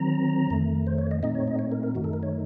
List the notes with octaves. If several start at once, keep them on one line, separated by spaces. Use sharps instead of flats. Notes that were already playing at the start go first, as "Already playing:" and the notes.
Already playing: D#3 F#3 C4 A#5
F2 D#3 A3
C5
C#5
D#5
A#2 A3 C4 D#4 D#5
C#5
D#5
C#5
A#4
A#4
F#2 D#3 A3 D#4 F#4
A4
A#4
C#5